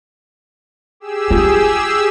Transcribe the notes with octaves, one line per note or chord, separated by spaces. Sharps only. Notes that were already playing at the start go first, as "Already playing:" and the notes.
G4 G#4 E6
F4